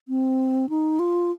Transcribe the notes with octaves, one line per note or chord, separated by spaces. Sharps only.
C4
D#4
F4